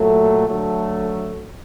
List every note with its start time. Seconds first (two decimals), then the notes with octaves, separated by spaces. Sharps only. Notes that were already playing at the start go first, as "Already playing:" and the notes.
Already playing: A#2 F#3 A3
0.47 D3 F#3 A3